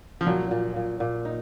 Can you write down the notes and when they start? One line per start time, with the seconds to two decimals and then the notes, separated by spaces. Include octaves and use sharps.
0.21 F3
0.27 A#2 F#3
0.51 A#2
0.76 A#2
1.00 A#2
1.25 D#4